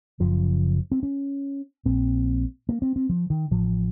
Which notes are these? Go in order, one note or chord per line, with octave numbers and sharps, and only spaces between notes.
F#1 F#2 C#3 F3
C4
C#4
A#1 A#2 C4
A#3
C4
C4
F3
D#3
A1 A2 F3